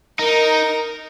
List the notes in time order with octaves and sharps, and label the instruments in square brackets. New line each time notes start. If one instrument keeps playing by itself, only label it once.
[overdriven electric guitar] D#4 [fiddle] A#4